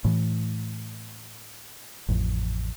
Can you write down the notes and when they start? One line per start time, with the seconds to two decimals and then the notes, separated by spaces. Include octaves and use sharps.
0.05 A2 E3
2.09 A1 F2